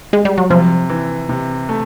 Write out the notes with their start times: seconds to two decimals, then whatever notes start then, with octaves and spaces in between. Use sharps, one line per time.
0.13 G#3
0.25 G3
0.38 F#3
0.50 C3 F3
0.90 E3
1.29 C3
1.69 A3